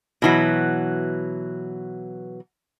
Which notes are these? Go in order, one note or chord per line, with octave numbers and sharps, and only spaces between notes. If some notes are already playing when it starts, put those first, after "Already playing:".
B2 E3 F#3